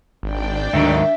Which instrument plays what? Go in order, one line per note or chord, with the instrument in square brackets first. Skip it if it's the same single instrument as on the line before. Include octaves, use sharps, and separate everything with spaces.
[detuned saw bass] G#1 [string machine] D4 D5 G5
[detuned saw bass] D2 [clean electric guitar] G#2 D#3 F#3 [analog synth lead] E5